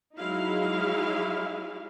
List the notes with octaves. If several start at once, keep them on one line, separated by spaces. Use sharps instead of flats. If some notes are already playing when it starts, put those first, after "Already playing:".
F#3 G#3 D#4 E4 G#4 F5